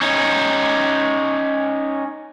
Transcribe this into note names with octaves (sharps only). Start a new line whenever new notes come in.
C#4 D#4